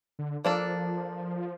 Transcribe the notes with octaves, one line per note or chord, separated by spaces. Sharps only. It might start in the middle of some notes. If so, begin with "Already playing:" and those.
D3
F3 A#3 D4 A4